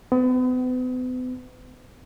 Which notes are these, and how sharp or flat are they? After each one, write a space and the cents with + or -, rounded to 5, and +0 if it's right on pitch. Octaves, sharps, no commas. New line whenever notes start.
B3 +40